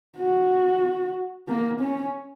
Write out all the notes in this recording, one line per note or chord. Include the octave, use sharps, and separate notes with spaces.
F#4
A#3
C#4